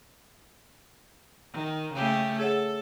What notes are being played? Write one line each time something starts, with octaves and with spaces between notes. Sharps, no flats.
D#3
C#3 A3 G4
G#4 A4 C#5 F#5